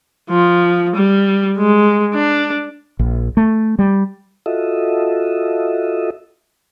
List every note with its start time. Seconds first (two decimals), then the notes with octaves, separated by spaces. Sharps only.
0.30 F3
0.96 G3
1.58 G#3
2.14 D4
2.99 A#1
3.37 A3
3.79 G3
4.46 F4 F#4 A4 D#5 E5